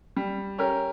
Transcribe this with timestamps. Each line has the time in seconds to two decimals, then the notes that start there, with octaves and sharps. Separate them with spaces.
0.16 G3
0.58 C#4 G4 A#4